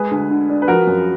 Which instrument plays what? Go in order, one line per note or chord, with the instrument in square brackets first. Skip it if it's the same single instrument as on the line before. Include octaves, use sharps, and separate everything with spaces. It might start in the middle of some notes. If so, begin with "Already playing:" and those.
Already playing: [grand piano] G#3 [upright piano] G#4 B4
[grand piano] D2
D3
D4
[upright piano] B4
[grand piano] F3 [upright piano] F#4 A#4
[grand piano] F#2